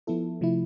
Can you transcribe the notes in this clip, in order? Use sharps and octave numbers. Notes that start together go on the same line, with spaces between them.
F3 B3 E4 A4
C3 F3 A3 E4